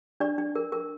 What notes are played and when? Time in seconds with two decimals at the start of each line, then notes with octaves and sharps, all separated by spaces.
0.20 D4 D5
0.38 D4
0.55 A#4
0.72 A#4